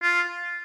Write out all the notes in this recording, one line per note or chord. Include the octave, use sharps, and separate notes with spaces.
F4